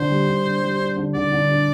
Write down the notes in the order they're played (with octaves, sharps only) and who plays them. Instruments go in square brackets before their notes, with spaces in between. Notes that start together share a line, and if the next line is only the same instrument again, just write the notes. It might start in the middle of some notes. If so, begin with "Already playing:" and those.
Already playing: [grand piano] D3 D4 [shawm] C5
[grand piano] G3
D3
D4
G3
D4
D3
[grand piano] D3 [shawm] D5
[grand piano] D3
D4